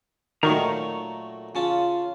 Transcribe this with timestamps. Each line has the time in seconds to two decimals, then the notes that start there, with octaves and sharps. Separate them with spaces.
0.43 A#2 D#3 F#3 A3 A#5 C#6
1.55 C#3 C#4 F4 A5